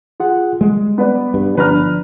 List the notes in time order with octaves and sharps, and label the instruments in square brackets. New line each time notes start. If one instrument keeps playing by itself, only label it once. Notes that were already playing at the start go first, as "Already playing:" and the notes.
[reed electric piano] F4 G#4 F#5
[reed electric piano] G3 [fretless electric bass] G#3
[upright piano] B3 B4 D5
[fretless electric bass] G2
[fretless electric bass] G1 D4 [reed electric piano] F3 [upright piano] B4 A#5 F6